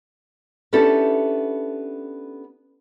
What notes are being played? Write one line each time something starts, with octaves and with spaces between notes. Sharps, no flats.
B3 C#4 D4 E4 G4 A4